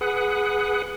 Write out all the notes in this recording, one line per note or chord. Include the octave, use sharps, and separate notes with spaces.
G#4 B4 F#5